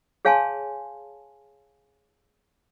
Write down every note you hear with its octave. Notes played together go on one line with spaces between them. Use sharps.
G#4 C#5 F5 G#5 A5 C6